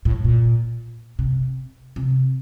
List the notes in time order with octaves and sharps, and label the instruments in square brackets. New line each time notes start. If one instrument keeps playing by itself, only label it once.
[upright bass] A2
A#2
C3
C3